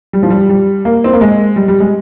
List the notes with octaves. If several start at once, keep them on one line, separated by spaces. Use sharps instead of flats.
G3
F3
G3
G3
A#3
C4
A#3
G#3
G3
G3
G#3